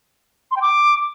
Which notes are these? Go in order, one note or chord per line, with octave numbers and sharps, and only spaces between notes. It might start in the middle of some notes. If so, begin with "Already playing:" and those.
C6
G5
D6